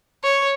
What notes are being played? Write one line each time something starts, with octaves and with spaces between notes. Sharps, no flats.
C#5